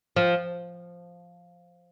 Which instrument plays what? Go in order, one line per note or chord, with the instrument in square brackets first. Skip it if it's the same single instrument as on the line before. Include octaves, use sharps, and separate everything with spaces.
[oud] F3